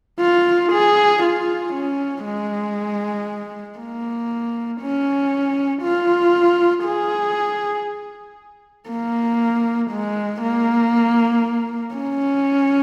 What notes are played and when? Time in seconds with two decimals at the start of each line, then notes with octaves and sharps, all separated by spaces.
0.20 F4
0.72 G#4
1.23 F4
1.74 C#4
2.25 G#3
3.79 A#3
4.81 C#4
5.82 F4
6.84 G#4
8.89 A#3
9.91 G#3
10.42 A#3
11.95 C#4